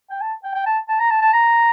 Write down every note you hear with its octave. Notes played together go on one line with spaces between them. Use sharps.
G5
A5
G5
G5
A5
A5
A#5
A5
A5
A#5